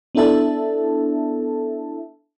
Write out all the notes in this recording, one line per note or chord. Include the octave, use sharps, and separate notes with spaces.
B3 D4 E4 A4 E5 A5